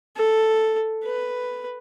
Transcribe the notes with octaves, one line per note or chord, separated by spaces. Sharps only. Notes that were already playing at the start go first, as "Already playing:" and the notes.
A4
B4